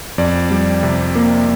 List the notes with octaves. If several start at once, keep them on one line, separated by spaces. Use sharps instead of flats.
F2 D5
G3
C3
A#3